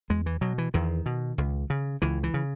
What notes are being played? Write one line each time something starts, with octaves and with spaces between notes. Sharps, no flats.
E2 G#3
E3
B2 F#3
E3
E2 D#3
B2
C#2
C#3
C#2 E3
E3
C#3